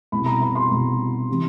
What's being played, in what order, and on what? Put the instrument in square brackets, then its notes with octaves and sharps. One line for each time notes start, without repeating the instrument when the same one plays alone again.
[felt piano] C2 B2 B5
A#5
B5
C6
C2 B2
C3 E3